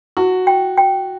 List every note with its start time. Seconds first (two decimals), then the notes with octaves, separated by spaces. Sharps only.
0.17 E4 F#4
0.47 G5
0.77 G5